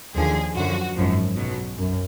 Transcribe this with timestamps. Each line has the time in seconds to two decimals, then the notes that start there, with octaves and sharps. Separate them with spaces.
0.16 D#2 D3 F3 G#4
0.56 F#2 D3 F3 F#4
0.95 G#1 F#2 F3
1.36 B1 B2 F#3
1.77 F#2